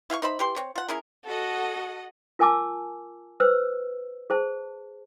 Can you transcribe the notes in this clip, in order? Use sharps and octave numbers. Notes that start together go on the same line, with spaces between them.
E4 F5 G5 C#6
D#4 C5 E5 B5
E3 G4 C6
C4 C#5
F4 F#5
C#4 E4 G#4 A#4
F#4 A4 D#5 F#5
F4 A#4 G#5 A5 D6 E6
B4 C5 E6
G#4 C5 A5